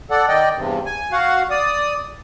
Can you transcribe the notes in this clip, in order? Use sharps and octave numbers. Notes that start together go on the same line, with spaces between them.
A4 D5 F#5
D#3 D5 D#5 G5
E2 G2 C3
G#5
F#4 F5 F#5
D5 D#6